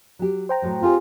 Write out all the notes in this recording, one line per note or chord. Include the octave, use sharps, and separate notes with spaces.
F#3 G4
C5 G5 A#5
A2 F#3 G#3
C4 F4 G4 G#4